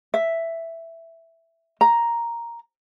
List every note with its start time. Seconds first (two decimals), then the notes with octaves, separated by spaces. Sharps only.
0.14 E5
1.81 A#5